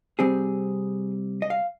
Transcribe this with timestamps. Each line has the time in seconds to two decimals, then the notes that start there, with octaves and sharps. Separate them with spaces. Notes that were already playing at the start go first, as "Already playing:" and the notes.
0.19 C3 G3 C4 G#4
1.42 D#5
1.50 F5